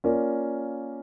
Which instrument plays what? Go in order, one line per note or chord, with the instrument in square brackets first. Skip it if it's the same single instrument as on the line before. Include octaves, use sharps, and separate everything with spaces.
[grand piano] A#3 C#4 F4 A#4 D5